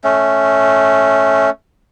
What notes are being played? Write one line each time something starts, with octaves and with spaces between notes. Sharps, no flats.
A3 C#4